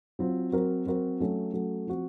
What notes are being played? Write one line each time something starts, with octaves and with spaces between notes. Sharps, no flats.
F#3 C4 F4
F#3 C4 F#4 A#4
F#3 C4 F#4 A#4
F#3 A3 C#4
F#3 A3 C#4
F3 C4 F#4